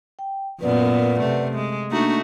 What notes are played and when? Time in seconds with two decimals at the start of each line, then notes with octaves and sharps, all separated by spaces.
0.19 G5
0.61 F#2 A#2 B3 B4 D5 F#5
1.20 C3 A3
1.55 G#3
1.91 A3 A#3 D4 D#4 F#4 A#5